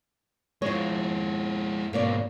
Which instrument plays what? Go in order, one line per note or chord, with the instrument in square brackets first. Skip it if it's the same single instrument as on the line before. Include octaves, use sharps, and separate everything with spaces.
[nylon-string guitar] F3 C#5 [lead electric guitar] G#3 E4
[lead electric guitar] G#2 B2 [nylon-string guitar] A#3 C#5 D5